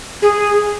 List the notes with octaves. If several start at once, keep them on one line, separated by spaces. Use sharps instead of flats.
G#4